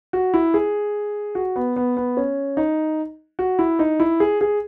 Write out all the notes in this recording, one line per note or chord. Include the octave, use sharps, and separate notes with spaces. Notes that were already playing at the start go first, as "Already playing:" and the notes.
F#4
E4
G#4
F#4
B3
B3
B3
C#4
D#4
F#4
E4
D#4
E4
G#4
G#4